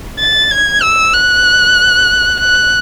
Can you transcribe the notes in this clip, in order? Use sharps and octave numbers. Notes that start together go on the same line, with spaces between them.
A6
G#6
E6
F#6
F#6